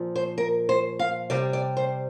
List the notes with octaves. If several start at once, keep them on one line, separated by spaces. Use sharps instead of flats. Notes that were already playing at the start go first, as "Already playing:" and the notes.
Already playing: A#2 F3
C5
A#4
C5
F5
C3 G3 D5
D5
C5